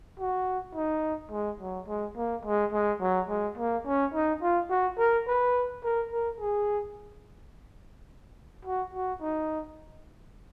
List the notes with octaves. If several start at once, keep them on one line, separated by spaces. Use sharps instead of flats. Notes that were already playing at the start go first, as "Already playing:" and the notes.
F#4
D#4
G#3
F#3
G#3
A#3
G#3
G#3
F#3
G#3
A#3
C#4
D#4
F4
F#4
A#4
B4
A#4
A#4
G#4
F#4
F#4
D#4